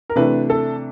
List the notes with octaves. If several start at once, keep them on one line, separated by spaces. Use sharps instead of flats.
A#4
C3 E3 A3 D4 B4
A4